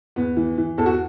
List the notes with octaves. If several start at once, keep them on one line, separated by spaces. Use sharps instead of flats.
E2 B3
E3
E3
E2 A4
F#4